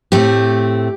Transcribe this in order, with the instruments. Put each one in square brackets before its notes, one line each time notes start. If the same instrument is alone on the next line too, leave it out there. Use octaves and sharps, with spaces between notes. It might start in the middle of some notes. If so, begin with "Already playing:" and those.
[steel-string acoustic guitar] A2 A3 C4 G4